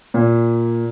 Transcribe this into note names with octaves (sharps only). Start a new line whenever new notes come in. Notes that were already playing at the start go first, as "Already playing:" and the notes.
A#2